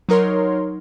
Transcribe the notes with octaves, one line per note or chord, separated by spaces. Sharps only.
F#3 D#4 A#4 C#5 C6